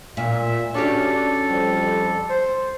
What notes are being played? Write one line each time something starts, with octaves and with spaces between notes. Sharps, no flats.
A#2 E5
C#4 D4 F#4 G4 A4
F2 F3 G3
C5